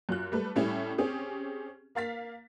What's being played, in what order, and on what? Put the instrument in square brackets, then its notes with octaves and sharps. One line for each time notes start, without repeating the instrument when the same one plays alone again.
[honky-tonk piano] F#2 F4 F#6
G3 A3 B4
A2 G3 C#4 E4
C4 C#4 G4 G#4
A#3 F5 A6 B6